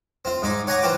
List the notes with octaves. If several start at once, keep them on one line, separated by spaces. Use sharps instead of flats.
C4 F4
G#2 D#4 D6
C#5 F#5 G#5 A#5 C#6 D6
E3 C4 F4 G5 D6